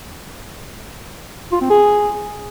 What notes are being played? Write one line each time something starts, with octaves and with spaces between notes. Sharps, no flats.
F4
C4
G#4